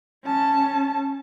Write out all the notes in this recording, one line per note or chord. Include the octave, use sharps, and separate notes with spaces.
C#4 A5